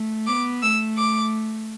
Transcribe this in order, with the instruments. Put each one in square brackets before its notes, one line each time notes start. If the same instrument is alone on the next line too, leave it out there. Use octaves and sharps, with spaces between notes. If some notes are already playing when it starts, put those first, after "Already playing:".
Already playing: [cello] A3
[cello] B3 [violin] D6
[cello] A3 [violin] E6
[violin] D6